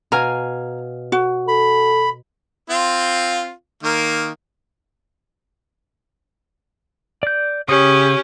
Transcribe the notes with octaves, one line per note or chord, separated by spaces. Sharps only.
B2 F5 G#5 A#5
F#4
A4 B5
C4 F4
D#3 A#3
D5 G6
C#3 C#4 G4 D#6